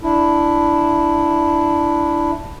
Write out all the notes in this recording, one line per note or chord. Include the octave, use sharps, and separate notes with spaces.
D4 E4